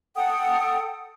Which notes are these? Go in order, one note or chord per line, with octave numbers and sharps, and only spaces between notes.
A4 F#5 G5 D#6